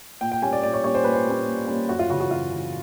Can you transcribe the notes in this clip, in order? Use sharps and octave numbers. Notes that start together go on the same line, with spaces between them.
A#2 G5
G5
G3 A#3 C#4 G#5
D5
A#2 D5
C#5
G3 A#3 C#4 C#5
C5
A#2 B4
C5
G3 A#3 C#4
A#2
G3 A#3 C#4
F#2 F#4
F4
C#3 E3 F#4
F#4
F#2 F4
C#3 E3